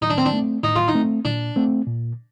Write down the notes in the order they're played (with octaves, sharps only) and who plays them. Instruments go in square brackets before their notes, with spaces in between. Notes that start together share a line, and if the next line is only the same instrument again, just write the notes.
[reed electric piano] A2 [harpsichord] D#4
[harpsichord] D4
C4
D4
[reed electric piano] A3 C4
[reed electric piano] A2 [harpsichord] D#4
[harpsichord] F4
D#4
[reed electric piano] A3 C4
[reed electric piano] A#2 [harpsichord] D4
[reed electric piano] A3 C4
A#2